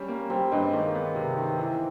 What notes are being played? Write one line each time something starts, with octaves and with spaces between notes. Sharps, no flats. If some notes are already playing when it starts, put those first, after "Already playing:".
Already playing: G3 C#4
A#3
G3 C4
G2 G#3
D#3 A#3
B3
C3
D#3
E3